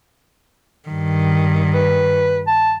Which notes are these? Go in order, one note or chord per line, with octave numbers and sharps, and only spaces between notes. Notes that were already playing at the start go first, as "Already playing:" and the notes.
G2 D#3
B4
A5